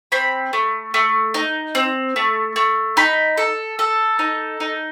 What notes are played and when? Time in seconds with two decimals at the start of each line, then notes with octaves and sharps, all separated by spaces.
0.12 C4 B5
0.53 A3
0.94 A3
1.34 D#4
1.75 C4
2.16 A3
2.56 A3
2.97 D#4 B5
3.37 A4
3.79 A4
4.19 D#4
4.60 D#4